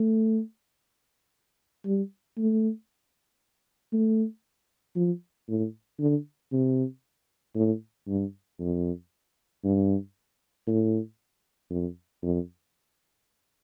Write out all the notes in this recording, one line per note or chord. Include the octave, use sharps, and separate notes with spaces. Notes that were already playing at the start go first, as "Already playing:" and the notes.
Already playing: A3
G3
A3
A3
F3
A2
D3
C3
A2
G2
F2
G2
A2
F2
F2